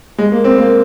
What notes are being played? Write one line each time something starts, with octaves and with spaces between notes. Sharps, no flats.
G#3
A#3
C4
A#3